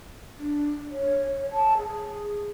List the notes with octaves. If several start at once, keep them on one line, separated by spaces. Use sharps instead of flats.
D4
C#5
A5
G#4